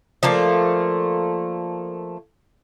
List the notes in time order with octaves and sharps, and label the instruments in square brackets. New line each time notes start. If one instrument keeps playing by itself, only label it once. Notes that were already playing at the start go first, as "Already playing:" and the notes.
[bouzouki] F3 A3 A#3 D5